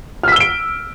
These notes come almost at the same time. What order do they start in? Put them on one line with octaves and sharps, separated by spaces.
F6 B6 E6 G7 D7